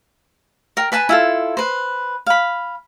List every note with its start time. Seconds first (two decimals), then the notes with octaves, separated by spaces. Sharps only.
0.77 A#4 G5
0.92 B4 G#5 A5 B5
1.09 E4 F4 A4
1.57 B4 C5
2.26 F5 B5